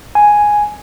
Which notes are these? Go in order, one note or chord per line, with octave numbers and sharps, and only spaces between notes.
G#5